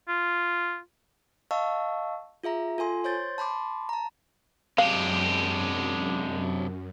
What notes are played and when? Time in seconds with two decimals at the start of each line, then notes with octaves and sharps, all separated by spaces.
0.08 F4
1.51 D#5 F5 A5 C#6 E6
2.44 F4 G#4 E5 A#5
2.78 F4 A4 G#5 C6
3.04 C5 C#5 C6 G6 A6
3.38 A5 B5 C6 D6
3.89 A5 A#5
4.78 F#2 C3 G#3 D4 G4 F5